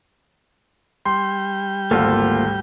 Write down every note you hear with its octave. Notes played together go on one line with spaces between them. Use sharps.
G3 G5 C6
G#1 D2 A#3 F4 A4